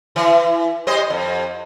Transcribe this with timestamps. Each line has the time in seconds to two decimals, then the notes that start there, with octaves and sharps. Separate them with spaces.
0.16 E3
0.87 G3 C5 D#5
1.10 F2